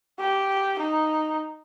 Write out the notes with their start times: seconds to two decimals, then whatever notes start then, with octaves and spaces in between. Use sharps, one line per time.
0.19 G4
0.79 D#4